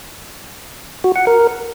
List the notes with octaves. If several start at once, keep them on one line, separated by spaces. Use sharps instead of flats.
F#4
F#5
A#4